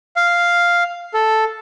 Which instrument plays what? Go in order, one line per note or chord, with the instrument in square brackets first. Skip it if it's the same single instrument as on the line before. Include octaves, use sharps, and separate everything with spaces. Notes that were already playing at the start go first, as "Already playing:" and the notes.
[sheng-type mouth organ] F5
A4